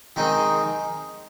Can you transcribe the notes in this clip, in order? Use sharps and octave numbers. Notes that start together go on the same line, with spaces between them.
D#3 G#3 C4 D#4 G#4